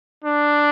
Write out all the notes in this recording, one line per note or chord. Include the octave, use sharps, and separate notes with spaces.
D4